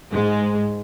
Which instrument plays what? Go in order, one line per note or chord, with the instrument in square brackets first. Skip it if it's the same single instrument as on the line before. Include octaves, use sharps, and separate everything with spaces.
[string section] G#2 G#3